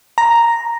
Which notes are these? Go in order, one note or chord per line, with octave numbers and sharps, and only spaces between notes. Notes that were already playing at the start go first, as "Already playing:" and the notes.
A#5